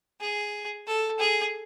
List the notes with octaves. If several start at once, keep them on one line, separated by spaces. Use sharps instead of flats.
G#4
A4
G#4